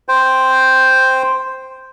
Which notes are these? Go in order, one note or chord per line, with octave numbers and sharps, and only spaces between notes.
C5 G5